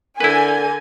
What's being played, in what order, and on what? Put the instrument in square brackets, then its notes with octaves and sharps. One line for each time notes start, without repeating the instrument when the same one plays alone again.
[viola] D3 [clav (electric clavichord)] E4 B4 [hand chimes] A#4 [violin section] G#5